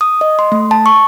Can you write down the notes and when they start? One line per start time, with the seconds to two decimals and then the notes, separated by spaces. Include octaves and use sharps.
0.01 D#6
0.21 D#5
0.39 C6
0.52 A3
0.71 A5
0.86 C#6